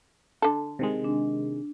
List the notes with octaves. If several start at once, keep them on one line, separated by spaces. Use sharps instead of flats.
D3 A4
C3 D#3 G#3
D4